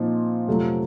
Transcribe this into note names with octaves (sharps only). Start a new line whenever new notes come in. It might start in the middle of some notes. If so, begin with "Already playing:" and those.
Already playing: A#2 F3 C4 D#4
F2 C3 F#3 A3